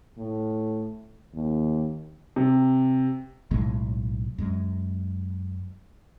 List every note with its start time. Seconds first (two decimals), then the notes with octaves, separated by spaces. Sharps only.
0.17 A2
1.34 D#2
2.36 C3
3.51 B1 A2 G#3
4.38 F#2 G#3